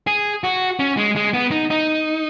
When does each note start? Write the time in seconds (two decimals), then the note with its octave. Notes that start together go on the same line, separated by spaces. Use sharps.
0.07 G#4
0.44 F#4
0.79 C#4
0.97 G#3
1.16 G#3
1.34 B3
1.51 D#4
1.70 D#4